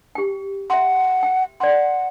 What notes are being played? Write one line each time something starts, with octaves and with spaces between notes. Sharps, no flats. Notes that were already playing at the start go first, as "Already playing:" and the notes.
G4 G5
E5 F#5 C6
G5
D5 F#5 C6